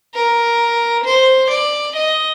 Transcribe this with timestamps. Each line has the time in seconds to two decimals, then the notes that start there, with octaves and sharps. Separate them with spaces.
0.14 A#4
1.05 C5
1.50 D5
1.96 D#5